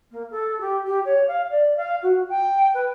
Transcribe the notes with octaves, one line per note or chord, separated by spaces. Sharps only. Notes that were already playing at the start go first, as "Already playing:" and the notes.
A#3
A4
G4
G4
C#5
F5
D5
F5
F#4
G5
B4